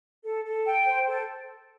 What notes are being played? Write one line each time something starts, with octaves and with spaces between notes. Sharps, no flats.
A4
A4
G5
C5
A4